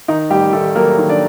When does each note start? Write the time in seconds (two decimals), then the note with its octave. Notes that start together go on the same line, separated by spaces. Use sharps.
0.08 D#3 D#4
0.30 A1 G3 G4
0.53 D#3 A3 A4
0.75 F#3 A#3 A#4
0.98 D#3
1.09 D4 D5